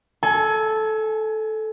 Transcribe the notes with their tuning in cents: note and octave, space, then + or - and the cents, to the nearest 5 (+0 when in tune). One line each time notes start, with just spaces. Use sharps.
A4 -10 G#5 +20